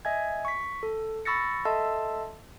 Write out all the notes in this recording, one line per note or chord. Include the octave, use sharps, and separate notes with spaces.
D#5 E5 G#5 G#6
C#6 B6
A4
B5 C#6 E6 A6 A#6 C#7
A4 D#5 E5 A5 C6 E6